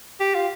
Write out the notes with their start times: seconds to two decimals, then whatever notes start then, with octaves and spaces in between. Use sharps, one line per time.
0.20 G4
0.35 F4